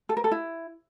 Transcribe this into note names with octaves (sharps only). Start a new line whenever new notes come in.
A4
A#4
A4
E4